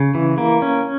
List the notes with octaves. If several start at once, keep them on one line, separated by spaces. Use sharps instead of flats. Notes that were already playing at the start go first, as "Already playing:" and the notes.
Already playing: C#3
E3
A#3
C#4